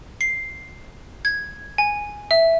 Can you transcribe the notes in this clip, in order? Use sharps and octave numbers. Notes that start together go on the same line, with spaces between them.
C7
G#6
G#5
E5